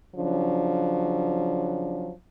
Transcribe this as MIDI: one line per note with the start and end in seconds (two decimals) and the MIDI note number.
0.15 2.11 49
0.15 2.11 53
0.15 2.11 54
0.15 2.11 61
0.15 2.11 62